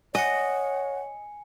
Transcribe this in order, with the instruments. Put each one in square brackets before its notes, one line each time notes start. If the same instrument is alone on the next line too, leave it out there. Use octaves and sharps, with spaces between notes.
[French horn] C#5 [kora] D#5 [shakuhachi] F#5 [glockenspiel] G#5 C#7